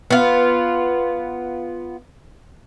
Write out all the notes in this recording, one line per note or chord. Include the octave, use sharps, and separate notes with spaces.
B3 F4